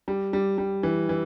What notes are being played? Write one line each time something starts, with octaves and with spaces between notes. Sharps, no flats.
G3
G3
G3
E3
E3